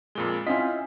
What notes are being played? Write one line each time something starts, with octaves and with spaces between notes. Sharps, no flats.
F2 A#2 G#3 G7
C4 C#4 E4 F4 D#5 C6 B6